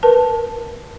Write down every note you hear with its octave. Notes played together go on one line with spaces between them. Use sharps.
A#4 B4 A5